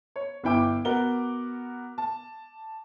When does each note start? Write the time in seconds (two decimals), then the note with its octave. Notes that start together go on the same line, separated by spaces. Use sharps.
0.16 C#5
0.44 G1 E4 G5 D6
0.85 B3 F#4 A#4 G7
1.98 A5